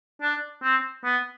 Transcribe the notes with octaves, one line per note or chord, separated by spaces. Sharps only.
D4
C4
B3